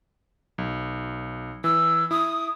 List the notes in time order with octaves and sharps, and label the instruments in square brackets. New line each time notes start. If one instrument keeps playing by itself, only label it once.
[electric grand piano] B1
[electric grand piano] E3 [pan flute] E6
[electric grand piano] E4 [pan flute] D#6